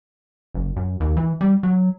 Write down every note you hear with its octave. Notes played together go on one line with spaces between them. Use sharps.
F#1
F#2
D#2
E3
G3
F#3